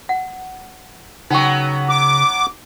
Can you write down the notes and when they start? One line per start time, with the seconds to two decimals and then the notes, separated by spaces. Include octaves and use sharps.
0.09 F#5
1.30 C#3 F#3 B3 D#4 G5 C#6
1.89 D6